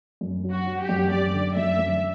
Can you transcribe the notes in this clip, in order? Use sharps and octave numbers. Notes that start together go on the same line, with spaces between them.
F#2
F#3
F#4
F#3
G4
F#2
F#2 D5
D3
F#2 E5
F#2